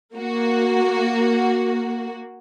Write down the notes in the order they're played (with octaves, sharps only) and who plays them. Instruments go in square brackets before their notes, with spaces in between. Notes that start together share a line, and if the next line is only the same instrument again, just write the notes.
[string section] A#3 F#4